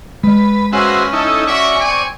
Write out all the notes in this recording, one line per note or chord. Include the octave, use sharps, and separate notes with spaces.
G#3 B4
A#3 C#4 F#4 G#4 B4 C5 E5
D#4 E4 A4
F#4 D5 E5 C#6
C4 G#5